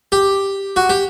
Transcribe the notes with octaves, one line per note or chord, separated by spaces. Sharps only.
G4
F#4
G4